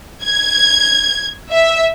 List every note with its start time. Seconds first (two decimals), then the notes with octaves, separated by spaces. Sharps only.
0.23 G#6
1.52 E5